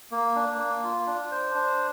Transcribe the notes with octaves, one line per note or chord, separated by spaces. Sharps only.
A#3
D4
A#3
F4
D4
C5
D4